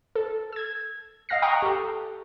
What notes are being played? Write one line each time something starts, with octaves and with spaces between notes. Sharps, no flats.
A4
E6 G#6
D#5 F5 F#5 F6 A#6 C7
G5 A#5 C#6 D#6 F#6
G4 A4